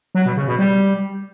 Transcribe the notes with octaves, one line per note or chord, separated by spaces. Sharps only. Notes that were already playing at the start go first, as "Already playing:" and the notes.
F#3
B2
C#3
B2
G3